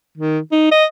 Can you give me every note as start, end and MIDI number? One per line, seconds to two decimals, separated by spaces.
0.18 0.39 51
0.52 0.68 63
0.72 0.85 75